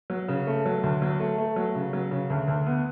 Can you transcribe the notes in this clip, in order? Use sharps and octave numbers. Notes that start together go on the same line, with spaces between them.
F#3
C#3
A3
F#3
D2
F#3
A3
A3
F#3
C#3
F#3
C#3
D2
D2
B3